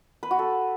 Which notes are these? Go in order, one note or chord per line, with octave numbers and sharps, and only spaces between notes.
B4
F#4
A4